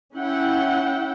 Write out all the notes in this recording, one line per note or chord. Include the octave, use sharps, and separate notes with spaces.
C#4 E4 F#5 G5